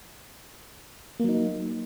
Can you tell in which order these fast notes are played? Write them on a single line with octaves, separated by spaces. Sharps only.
A#3 F#3 D#4